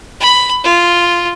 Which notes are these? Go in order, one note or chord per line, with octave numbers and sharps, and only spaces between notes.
B5
F4